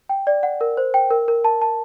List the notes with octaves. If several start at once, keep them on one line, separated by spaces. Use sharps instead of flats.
G5
D5
F#5
A#4
C5
G5
A#4
A#4
A5
A5